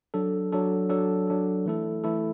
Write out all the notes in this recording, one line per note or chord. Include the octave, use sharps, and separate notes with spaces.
F#3 D4 A4
F#3 D4 A4
F#3 D4 A4
F#3 D4 A4
E3 A3 E4 A4
E3 A3 E4 A4